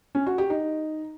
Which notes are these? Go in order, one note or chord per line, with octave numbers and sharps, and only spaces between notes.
C#4
F#4
G4
D#4